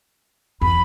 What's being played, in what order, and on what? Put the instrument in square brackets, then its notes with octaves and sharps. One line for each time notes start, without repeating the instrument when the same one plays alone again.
[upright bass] E2 [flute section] B5